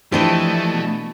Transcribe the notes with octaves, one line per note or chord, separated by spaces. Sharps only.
E3 F3 A3 D4 G4 D#5 A5
B2